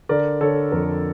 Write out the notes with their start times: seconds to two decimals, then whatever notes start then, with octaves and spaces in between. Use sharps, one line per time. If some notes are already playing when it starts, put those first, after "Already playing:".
0.09 D3 A#4 D5
0.41 D3 A4 C#5
0.72 F2 A#4